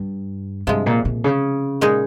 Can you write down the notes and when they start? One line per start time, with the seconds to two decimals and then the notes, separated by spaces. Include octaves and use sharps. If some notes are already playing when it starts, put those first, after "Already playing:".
Already playing: G2
0.67 G2 C3 F3 G#3
0.86 A#2
1.05 A#2
1.24 C#3
1.81 A#2 G#3 D#4 G#4